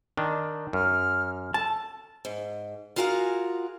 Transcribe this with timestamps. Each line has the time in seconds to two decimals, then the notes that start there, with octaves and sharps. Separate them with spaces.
0.17 D#3 D4
0.73 F#2 F6
1.54 A4 A5
2.25 G#2
2.96 F4 F#4 G#4 A#4 F5 F#5